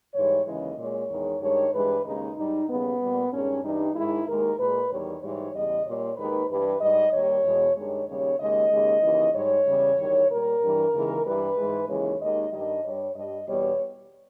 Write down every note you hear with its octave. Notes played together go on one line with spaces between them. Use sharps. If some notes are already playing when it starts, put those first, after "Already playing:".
G#2 E3 G3 C#5
D#2 C#3 E3 G#3 D#5
A#2 G#3 C#5
E2 D#3 G#3
G2 D#3 G#3 C#5
G2 E3 G#3 B4
D#2 C#3 G#3 D#4
G#2 G3 D#4
D#2 C#3 G3 B3
A#2 G3
G2 D#3 G#3 C#4
G2 E3 G3 D#4
G#2 D#3 G#3 E4
D#2 D#3 G#3 A#4
A#2 G#3 B4
E2 D#3 G3 C#5
G#2 E3 G3 C#5
E2 C#3 G3 D#5
A#2 G3 C#5
D#2 D#3 G#3 B4
G2 E3 G3 B4
G#2 G3 D#5
D#2 D#3 G3 C#5
E2 B2 G#3
G2 D#3 G#3 C#5
D#2 C#3 G3 C#5
D#2 C#3 G#3 D#5
D#2 C#3 G#3
D#2 C#3 E3
G#2 G3 C#5
E2 C#3 G3
E2 D#3 G3
A#2 G3 A#4
G2 E3 G3
D#2 C#3 E3 G#3
G2 E3 G3 B4
G#2 E3 G#3
D#2 C#3 E3 G#3 C#5
D#2 D#3 G#3 D#5
G2 D#3 G3 D#5
G2 G3 C#5
G2 G3 D#5
E2 B2 G3 C#5